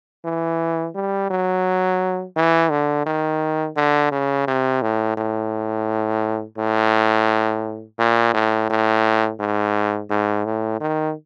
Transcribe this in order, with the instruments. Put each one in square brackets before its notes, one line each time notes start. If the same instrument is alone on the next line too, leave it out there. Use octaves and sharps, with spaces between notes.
[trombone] E3
G3
F#3
E3
D3
D#3
D3
C#3
C3
A2
A2
A2
A#2
A2
A2
G#2
G#2
A2
D#3